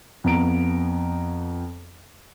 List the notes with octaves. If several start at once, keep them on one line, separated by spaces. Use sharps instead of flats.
F2 B3 A#5 D7